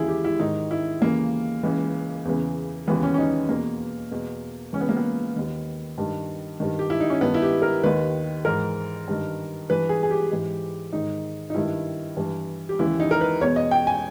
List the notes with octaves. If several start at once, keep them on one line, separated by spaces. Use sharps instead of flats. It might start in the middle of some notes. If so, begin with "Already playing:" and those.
Already playing: D#2 C#3 E3 E4 G#4
G4
E4
G#2 D#3 D#4
E4
D#2 C#3 E3 A#3
C#2 C#3 E3
E2 C#3 E3
D#2 C#3 E3 B3
C#4
C#4
D#4
E2 B2 A#3
E2 B2
C#2 C#3 E3 C#4
B3
A#3
B3
D#2 D#3
G2 D#3
G2 D#3
G4
E4
D#4
C#4
G2 D#3 B3
E4
G4
A#4
D#2 D#3 B4
G#2 E3 A#4
G2 D#3
G2 E3 B4
G#4
G#4
G4
G#2 E3
G#2 D#3 D#4
D#4
G2 D#3 E4
G2 E3
G4
D#2 C#3 E3 E4
D#4
A#4
B4
E2 B2 C#5
D#5
G5
G#5